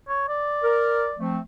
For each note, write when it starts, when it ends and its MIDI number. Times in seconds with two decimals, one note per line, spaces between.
0.08 0.26 73
0.28 1.18 74
0.64 1.07 70
1.19 1.39 53
1.19 1.39 57
1.19 1.39 60